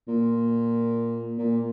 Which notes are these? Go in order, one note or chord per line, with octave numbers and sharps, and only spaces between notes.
A#2
A#2